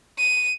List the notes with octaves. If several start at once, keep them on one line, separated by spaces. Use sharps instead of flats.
D#7